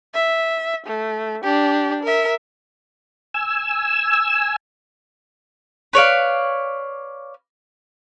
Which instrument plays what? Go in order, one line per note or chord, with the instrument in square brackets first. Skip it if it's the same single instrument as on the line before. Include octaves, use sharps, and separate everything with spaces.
[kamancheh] E5
A3
D4 G4
A#4 E5
[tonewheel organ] G#5 E6
[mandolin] B4 C#5 D5 F5